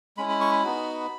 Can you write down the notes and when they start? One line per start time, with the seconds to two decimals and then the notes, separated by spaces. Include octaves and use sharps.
0.17 G#3 C#4 E4 B5
0.29 B5
0.41 C#6
0.52 B5
0.64 B3 D#4 F#4